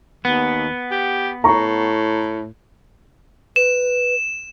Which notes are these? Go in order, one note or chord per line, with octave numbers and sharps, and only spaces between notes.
D#2 B3
G4
A2 A#5 C#6
B4 E7